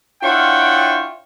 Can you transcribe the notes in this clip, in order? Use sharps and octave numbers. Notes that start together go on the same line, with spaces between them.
D4 E4 F4 C#5 F#5 G5